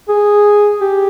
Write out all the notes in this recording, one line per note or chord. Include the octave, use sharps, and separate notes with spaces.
G#4
G4